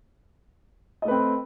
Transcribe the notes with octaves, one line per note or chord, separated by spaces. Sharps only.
A3 C4 B4 D#5